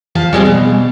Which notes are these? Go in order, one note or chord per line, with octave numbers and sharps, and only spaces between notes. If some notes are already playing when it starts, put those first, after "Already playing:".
F3 F5 A5
G3 G#3 C4
B2